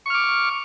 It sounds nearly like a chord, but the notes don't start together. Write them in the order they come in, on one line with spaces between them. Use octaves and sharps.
C#6 F6 D6